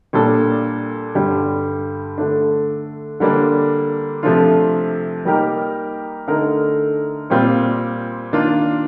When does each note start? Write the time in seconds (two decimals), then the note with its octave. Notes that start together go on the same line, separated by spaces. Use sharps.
0.13 A#2 G3 D4 A4
1.15 G2 D3 G3
2.18 D3 A3 D4
3.20 D3 G3 A#3 D4
4.23 C3 F3 A3 D4 F4
5.25 G3 A#3 D#4 G4 A#4
6.27 D3 A3 D#4 A#4
7.30 A#2 G3 C4 F4
8.33 D#3 A#3 D4 F4